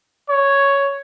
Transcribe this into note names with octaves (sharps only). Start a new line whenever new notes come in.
C#5